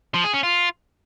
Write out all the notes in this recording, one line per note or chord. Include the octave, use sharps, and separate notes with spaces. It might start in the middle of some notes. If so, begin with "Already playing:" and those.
F3
G#4
C#4
F4